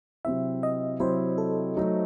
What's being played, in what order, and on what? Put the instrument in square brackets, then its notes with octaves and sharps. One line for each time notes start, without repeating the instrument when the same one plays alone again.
[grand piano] C3 F#3 C4 E4 [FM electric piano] E5
[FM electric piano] D#5
[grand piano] C3 F#3 C4 E4 [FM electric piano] C5
[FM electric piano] A4
[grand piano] F#3 A3 D#4